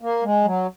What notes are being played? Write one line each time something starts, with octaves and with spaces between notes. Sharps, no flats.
A#3
G#3
F#3